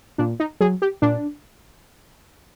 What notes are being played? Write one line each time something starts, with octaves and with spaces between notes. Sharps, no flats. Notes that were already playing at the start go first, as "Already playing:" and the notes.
A#2 D4
D#4
F#3 G#4
G4
A#2 D4